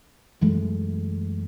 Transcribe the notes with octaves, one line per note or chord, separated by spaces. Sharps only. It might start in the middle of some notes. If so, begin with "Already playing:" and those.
F#2 E3 G#3 A3